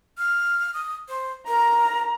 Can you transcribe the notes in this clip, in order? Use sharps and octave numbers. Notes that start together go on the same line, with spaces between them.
F6
D#6
C5
A#4 A#5